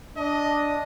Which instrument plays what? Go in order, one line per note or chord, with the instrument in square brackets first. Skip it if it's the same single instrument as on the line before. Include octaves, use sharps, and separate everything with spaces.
[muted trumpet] D4 [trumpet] D#5